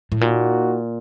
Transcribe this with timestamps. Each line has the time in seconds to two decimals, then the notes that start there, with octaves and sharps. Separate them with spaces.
0.12 A2
0.21 A#2 A#3 D#4 F#4